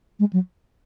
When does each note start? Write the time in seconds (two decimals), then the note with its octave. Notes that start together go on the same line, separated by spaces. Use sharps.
0.19 G#3
0.33 F#3